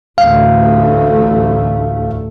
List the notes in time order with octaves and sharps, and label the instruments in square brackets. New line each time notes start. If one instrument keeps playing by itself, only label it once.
[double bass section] A1 D2 A3 [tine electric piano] F5